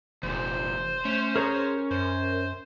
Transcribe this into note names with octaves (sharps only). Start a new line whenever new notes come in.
F1 E2 A#2 C5
A3 C#4
G#4 A#4 C#5 A#5
F#2 C5